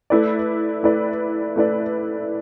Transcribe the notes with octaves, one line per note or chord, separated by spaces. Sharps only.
A3 E4 B4 D5
A3 E4 B4 D5
A3 E4 B4 D5